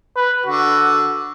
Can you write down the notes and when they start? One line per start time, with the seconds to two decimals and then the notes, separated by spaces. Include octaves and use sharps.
0.16 B4
0.46 D3 F#4